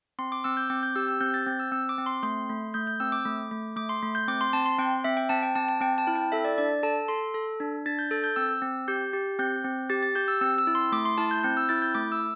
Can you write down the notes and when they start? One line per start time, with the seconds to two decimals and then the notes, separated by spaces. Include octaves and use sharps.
0.19 C4 C6
0.32 D6
0.44 C4 E6
0.57 G6
0.70 C4 D6
0.83 G6
0.96 G4 E6
1.08 E6
1.21 C4 G6
1.34 A6
1.46 C4 G6
1.60 E6
1.72 C4 E6
1.89 D6
1.98 C4
2.06 C6
2.23 A3 C6
2.49 A3
2.74 A3 G6
2.87 G6
3.00 C4 E6
3.12 D6
3.25 A3
3.51 A3
3.76 A3 D6
3.89 C6
4.03 A3
4.15 G6
4.28 C4 D6
4.41 C6
4.53 C4 A5
4.66 C6
4.79 C4 G5
5.04 C4 E5
5.17 G5
5.29 C4 A5
5.42 G5
5.55 C4 A5
5.69 A5
5.81 C4 G5
5.98 A5
6.07 E4
6.15 G5
6.32 A4 E5
6.45 D5
6.58 D4 D5
6.83 A4 A5
7.08 A4 C6
7.34 A4
7.60 D4
7.86 D4 A6
7.99 G6
8.11 A4 A6
8.24 G6
8.36 C4 E6
8.62 C4
8.88 G4 G6
9.13 G4
9.39 C4 G6
9.64 C4
9.90 G4 A6
10.03 A6
10.15 G4 G6
10.28 E6
10.41 C4 E6
10.58 E6
10.67 E4
10.75 C6
10.92 A3 D6
11.05 C6
11.18 E4 A5
11.31 G6
11.44 C4 G6
11.57 E6
11.69 E4 A6
11.82 G6
11.95 A3 D6
12.12 E6